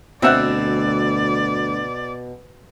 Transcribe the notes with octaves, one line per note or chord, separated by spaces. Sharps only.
D2 B2 C4 D5 E5 F#5